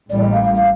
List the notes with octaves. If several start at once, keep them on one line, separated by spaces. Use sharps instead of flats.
A1 A2 G3 A#3 D5
D#5
F5
F5
F5